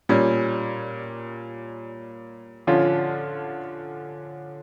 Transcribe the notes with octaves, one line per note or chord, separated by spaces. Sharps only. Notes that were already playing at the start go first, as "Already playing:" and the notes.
A#2 G3 C#4
D3 F3 C#4 F4